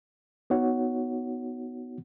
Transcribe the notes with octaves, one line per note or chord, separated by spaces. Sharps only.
B3 D#4 F#4 C#5 F#5